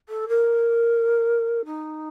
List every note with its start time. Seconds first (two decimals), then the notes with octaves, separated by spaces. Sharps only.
0.09 A4
0.28 A#4
1.65 D#4